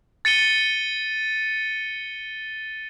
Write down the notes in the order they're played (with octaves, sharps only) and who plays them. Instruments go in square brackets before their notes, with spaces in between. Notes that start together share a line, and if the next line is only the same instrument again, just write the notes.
[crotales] A6 C#7 D#7 G7